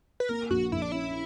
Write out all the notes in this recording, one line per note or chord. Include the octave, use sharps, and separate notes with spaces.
B4
A#3 A#4
A#1 F#4
A#1 E4
D4
C#4 E4